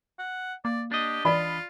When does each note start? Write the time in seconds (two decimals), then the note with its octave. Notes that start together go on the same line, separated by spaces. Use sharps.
0.19 F#5
0.65 A#3 D5
0.92 D4 G4 D#5
1.25 E3 F4 D5 B5